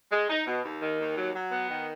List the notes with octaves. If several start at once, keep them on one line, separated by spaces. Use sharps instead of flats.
G#3
D#4
B2
D#2
D#3
D#2
F#3
F#3
B3
D#3